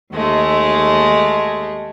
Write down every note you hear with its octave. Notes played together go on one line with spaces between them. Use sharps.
D#2 G#3 A3